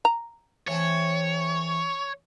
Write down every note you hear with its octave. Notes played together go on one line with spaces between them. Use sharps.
A#5
E3 A3 C4 C#5